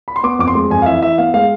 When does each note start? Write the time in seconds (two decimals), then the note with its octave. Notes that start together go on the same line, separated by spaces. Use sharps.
0.08 B5
0.16 C6
0.23 B3 D6
0.39 F2 D6
0.48 C6
0.55 G#3
0.70 F2 G#5
0.82 F5
0.86 E3 E5
1.02 E3 E5
1.18 B3 F5
1.34 G#3 F5